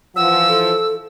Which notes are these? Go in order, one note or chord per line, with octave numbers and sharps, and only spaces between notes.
E3 F3 F#5 E6
A4